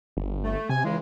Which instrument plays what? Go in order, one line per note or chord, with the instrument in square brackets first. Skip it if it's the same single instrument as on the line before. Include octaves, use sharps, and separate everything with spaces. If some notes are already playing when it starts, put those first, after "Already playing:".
[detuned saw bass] G1
[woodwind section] A3
[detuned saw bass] C3 [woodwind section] G#5
[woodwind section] C#2 C#3 G#3 [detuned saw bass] E3